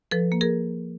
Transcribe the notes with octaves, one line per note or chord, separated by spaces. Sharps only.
F3 A4 B4
A#3
G#4 A#4